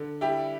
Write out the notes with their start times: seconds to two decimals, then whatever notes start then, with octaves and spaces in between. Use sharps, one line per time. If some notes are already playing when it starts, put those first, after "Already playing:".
Already playing: D3
0.21 G3 E4 G4